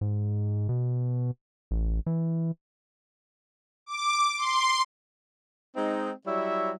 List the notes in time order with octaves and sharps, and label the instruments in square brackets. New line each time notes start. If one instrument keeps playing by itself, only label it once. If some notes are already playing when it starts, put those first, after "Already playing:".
[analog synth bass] G#2
B2
A1
E3
[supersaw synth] D6
C6
[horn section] G#3 C4 D#4
F#3 G3 E4 C#5 E5